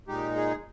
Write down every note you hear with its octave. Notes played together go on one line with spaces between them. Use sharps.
A#2 G#3 D#4 G4
G#4